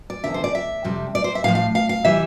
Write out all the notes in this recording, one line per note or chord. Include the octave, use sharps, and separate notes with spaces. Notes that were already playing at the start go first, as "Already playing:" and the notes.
D5
E2 D3 F3 E5
C5
D5
E5
F2 C3 G3
D5
C5
E5
A2 F3 F5
F5
F5
F5
C3 E3 G3 E5